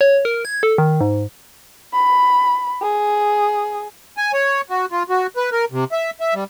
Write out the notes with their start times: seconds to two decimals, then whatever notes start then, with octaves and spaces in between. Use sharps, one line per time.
0.01 C#5
0.25 A#4
0.45 G#6
0.63 A4
0.78 D#3
1.01 G#2
1.93 B5
2.82 G#4
4.17 G#5
4.33 C#5
4.70 F#4
4.92 F4
5.09 F#4
5.37 B4
5.52 A#4
5.72 C3
5.92 E5
6.20 E5
6.34 G3